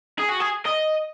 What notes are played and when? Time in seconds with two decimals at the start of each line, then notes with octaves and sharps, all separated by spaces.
0.19 G#4
0.29 F#4
0.40 G#4
0.66 D#5